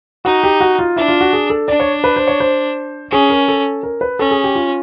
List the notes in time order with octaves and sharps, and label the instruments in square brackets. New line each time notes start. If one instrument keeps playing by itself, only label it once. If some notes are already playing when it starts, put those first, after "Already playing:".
[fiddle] D#4 [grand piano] F#4
[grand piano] G4
F#4
F4
[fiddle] D4 [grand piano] E4
[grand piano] F4
F#4
G#4
A4
[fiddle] D4 [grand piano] D5
[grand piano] C#5
B4
C5
C#5
C5
[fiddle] C#4 [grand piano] G#4
[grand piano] A#4
A4
A#4
B4
[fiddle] C#4 [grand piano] A4
[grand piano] G#4
G4
F4